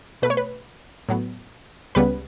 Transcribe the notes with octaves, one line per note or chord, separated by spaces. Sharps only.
B2 A3 B4
C#5
B4
A2 F#3 B3
C#2 C#3 G3 B3 B4